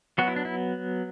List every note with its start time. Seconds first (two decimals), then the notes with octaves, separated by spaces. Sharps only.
0.18 F#3 B3 F#4
0.28 E4
0.36 D4
0.45 E4